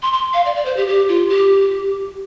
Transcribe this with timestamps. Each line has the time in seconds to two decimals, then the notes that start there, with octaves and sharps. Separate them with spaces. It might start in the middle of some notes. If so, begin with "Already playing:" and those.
0.02 C6
0.13 C6
0.34 F5
0.45 D5
0.56 D5
0.65 C5
0.77 G4
0.87 G4
1.09 F4
1.30 G4